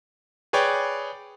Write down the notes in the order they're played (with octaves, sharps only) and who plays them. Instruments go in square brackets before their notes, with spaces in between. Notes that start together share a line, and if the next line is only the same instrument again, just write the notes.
[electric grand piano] G#4 B4 C#5 D5 G5